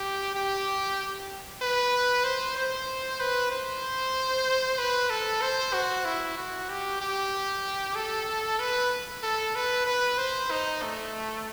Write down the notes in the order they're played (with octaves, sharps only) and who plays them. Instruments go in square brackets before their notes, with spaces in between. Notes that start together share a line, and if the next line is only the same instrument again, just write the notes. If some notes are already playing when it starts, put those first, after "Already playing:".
Already playing: [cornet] G4
G4
B4
C5
C5
B4
C5
B4
A4
C5
F#4
E4
F#4
G4
G4
A4
B4
A4
B4
B4
C5
D#4
A3